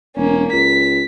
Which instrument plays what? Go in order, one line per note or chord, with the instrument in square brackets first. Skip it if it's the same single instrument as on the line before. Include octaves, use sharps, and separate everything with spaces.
[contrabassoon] E1 [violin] A#3 C#4
[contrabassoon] C#2 [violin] B6